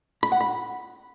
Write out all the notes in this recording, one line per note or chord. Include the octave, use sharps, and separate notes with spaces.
B5
F#5
B5